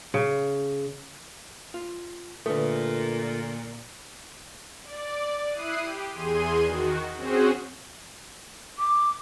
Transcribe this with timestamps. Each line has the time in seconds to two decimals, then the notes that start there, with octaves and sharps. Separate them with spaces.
0.14 C#3
1.74 F4
2.46 A#2 D3 A3 A4 B4
4.83 D5
5.49 E4 D#6 F#6 C7 D#7
5.82 G4
6.11 E2 G#4 C6 D#7
6.62 D#3 F#4
7.17 C4 C#4 F#4 G#4 C5
8.78 D6